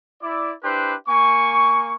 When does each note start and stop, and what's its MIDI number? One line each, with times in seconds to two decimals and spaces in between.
0.21 0.53 64
0.21 0.53 74
0.63 0.94 62
0.63 0.94 64
0.63 0.94 67
0.63 0.94 71
0.63 0.94 72
1.08 1.93 58
1.08 1.93 80
1.08 1.93 85